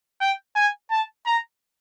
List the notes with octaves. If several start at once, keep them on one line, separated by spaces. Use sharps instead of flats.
G5
G#5
A5
A#5